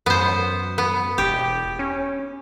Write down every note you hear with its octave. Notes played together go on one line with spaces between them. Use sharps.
F#2 B3 C5
B3
E1 G4
C#4